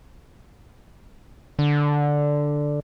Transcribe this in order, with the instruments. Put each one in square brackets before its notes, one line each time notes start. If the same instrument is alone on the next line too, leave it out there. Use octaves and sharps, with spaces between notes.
[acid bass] D3